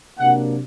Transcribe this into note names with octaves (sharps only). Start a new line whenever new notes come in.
C3 F#3 A#3 D4 F#5